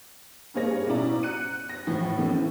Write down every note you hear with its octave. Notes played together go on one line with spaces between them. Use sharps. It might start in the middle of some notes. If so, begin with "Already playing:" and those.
G2 G3 A#3 G#4 C#5 A#6
B2 C#4 E4 D5 A#5
F#6 C#7 D#7
A#6
A2 E3 F3
D#3 E3 A3 A#3 C4 C#4